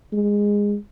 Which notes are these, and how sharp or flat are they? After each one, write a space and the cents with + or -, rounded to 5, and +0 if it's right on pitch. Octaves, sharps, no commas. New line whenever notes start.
G#3 -15